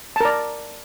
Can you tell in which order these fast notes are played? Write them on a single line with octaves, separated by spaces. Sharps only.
A5 A#4 D5